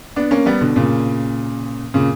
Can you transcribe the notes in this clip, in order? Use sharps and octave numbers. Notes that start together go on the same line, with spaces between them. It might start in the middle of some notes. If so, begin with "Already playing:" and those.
B3 D4
A#3 C#4
G3 B3
B2 D3
A#2 C#3
A#2 C#3